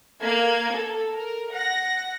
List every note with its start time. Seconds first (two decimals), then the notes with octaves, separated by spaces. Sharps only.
0.22 A#3 G#6
0.73 A4
1.14 A#4
1.53 F#5 A#6